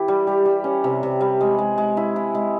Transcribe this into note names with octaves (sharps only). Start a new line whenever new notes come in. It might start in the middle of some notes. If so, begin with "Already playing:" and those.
Already playing: E3 E4 G4
G3
G3
G3
C#4
C3
C3
G3
G#3
G#3
G#3
E4
E4
G#3